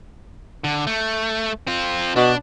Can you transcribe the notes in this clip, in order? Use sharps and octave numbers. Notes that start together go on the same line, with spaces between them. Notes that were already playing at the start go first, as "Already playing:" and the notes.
D3
A3
C4 F4
B2 D4